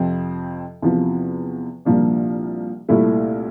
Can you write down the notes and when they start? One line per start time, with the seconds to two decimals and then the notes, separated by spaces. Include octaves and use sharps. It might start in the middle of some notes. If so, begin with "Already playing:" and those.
Already playing: F2 C3 F3 C4
0.82 E2 C3 F3
1.85 C2 A#2 F3 A#3 D4
2.89 C2 A#2 A3 E4